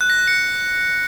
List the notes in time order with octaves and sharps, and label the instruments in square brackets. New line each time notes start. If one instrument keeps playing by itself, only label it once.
[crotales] F#6
A#6
F#6
C#7